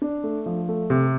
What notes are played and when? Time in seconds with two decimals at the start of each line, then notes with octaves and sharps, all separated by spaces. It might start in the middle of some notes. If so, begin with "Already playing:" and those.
0.02 D4
0.24 A3
0.46 F3
0.68 A3
0.90 C3